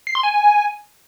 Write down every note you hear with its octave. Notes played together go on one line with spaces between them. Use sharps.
C7
C6
G#5